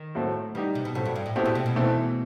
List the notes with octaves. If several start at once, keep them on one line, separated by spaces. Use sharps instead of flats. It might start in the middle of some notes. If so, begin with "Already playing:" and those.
Already playing: D#3
A2 F#3 A3 C4
E3 G3 D#4 G4
C3
B2
A2 F#3 C4 F#4 A4
G2
G2
A2
G2 B2 A3 C4 E4 G4
A2
C3
B2
E3 A3 C4